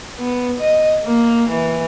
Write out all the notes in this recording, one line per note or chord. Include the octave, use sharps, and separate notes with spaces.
B3
D#5
A#3
E3